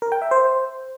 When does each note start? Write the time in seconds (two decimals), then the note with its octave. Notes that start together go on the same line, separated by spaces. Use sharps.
0.02 A#4
0.12 G5
0.22 E5
0.31 C5